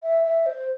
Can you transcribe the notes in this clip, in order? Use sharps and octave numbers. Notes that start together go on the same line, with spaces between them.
E5
E5
C5